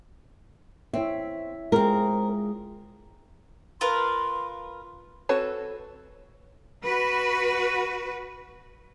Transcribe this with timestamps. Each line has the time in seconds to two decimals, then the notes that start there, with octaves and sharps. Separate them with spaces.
0.94 C4 E4 C#5 E5
1.72 G#3 C4 F4 G#4 A#4
3.81 F4 A#4 B4 C6
5.29 C4 F#4 A4 B4 C#5
6.84 F#4 B4